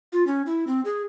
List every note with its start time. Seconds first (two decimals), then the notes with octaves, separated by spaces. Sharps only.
0.13 F4
0.27 C#4
0.46 E4
0.67 C4
0.85 G#4